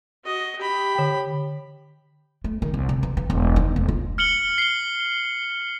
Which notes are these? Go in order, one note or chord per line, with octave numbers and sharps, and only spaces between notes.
F#4 D#5
G4 B5
D3 G5
A3
D#3
C2
C3
E3
E3
E1
D#3
F1
F4
F6 C#7 F#7 G7
C7 G7